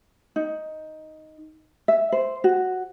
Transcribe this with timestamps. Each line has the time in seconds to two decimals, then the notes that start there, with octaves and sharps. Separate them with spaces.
0.36 D#4
1.88 E5
2.12 C5
2.44 F#4